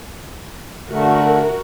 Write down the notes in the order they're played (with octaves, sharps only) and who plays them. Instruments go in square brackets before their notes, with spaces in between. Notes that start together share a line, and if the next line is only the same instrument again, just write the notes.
[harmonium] D3 A3 [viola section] F#4 A#4